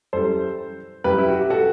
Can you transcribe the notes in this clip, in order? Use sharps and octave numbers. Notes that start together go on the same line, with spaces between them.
F#2 E3 G3 A4 C5
F#2 E3 G3 G4 B4
E4
F#4
G4
F#4 A4